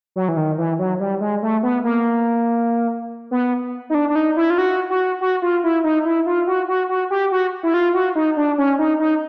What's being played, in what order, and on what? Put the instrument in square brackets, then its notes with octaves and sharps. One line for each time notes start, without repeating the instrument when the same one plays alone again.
[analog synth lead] F#3
E3
D#3
E3
F#3
G3
G#3
A3
B3
A#3
B3
D#4
D4
D4
D#4
E4
F4
F#4
F#4
F#4
F4
E4
D#4
E4
F4
F#4
F#4
F#4
G4
F#4
E4
F4
F#4
D#4
D4
C#4
D#4
D#4